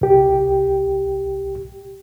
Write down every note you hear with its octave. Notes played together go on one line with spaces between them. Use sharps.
C2 G4